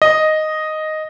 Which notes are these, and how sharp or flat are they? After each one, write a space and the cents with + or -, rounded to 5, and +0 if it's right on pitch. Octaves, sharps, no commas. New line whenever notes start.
D#5 +0